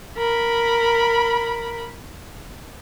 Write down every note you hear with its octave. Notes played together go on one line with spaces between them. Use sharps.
A#4 B5